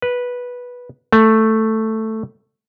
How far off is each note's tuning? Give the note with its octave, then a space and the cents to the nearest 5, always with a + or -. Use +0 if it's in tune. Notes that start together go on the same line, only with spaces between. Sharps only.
B4 -10
A3 +5